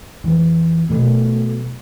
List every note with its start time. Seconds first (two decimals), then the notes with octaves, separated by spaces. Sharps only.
0.24 F2 E3
0.90 B2 F#3 A3